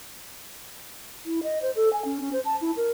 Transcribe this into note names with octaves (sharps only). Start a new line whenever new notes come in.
E4
D#5
C5
A4
G#5
C#4
C#4
C5
A5
E4
A#4